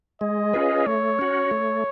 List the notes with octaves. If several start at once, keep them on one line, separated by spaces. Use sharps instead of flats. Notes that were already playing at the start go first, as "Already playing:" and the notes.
G#3 D#5
C#4 F4 G#4 B4
A3 C#5
C#4 F#4
A3